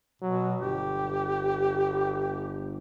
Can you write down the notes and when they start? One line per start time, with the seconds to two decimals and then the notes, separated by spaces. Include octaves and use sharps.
0.22 B2 F#3
0.61 G1 G4